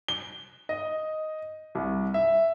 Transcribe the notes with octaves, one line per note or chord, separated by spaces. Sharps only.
G7
D#5
C2
E5